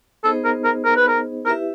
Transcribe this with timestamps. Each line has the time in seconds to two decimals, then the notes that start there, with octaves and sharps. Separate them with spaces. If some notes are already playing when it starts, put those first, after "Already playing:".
0.24 B3 D#4 G#4 A4 C5 D#5
0.45 A#4
0.64 A#4
0.85 A#4
0.96 B4
1.08 A#4
1.45 E4 G4 A#4 B4 E5